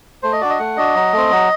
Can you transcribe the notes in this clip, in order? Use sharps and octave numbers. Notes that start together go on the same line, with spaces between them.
A3 C5
D#5
D4 F#4 D5
D#5
A3 F#5
D4 F#4 D#5
F#3
A3 C4
F#3